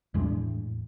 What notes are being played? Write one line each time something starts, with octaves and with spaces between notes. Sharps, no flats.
E2 A2 G#3 D4